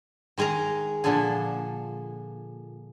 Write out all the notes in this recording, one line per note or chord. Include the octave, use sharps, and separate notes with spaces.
D#3 G#3 G#4 A#4 A#5
A#2 D3 F3 D4 G#4